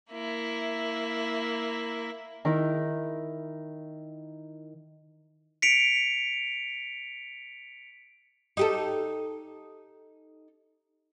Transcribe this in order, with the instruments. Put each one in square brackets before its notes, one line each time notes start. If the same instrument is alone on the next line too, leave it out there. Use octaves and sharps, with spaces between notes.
[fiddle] A#3 E4
[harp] D#3 E4
[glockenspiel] B6 C#7 D7 F7
[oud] D#4 G4 A4